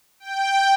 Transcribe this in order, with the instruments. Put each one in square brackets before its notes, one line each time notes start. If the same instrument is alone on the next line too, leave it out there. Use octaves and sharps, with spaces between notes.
[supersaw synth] G5